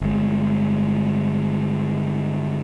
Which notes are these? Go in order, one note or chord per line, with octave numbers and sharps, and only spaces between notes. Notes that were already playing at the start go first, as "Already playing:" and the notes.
G1 G#3